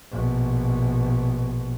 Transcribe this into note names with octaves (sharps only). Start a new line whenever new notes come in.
A#1 B2